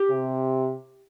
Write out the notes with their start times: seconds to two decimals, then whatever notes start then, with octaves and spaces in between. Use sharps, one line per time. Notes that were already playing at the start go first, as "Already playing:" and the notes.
Already playing: G4
0.09 C3